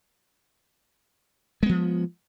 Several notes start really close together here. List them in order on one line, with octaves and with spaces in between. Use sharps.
G#3 B3 F3